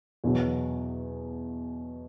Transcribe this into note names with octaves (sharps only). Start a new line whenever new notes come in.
E2 B2 F#3